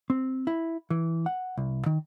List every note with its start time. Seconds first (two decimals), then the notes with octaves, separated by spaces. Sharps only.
0.10 C4
0.47 E4
0.90 E3
1.26 F#5
1.57 C2
1.86 D#3